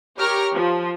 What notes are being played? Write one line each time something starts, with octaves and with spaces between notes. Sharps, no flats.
G4 A#4 C#5 A#5 C#6 F6
F3